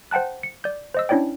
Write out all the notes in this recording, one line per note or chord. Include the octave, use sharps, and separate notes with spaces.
C5 F#5 G5 A5 F#6
C#7
D5 G6
C5 D#5 E6
C#4 D4 E4 C#5 D5 G5